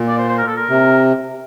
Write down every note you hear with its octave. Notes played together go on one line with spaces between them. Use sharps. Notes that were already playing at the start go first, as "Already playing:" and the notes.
Already playing: A#2
D5
C5
C5
A#4
A4
A#4
C3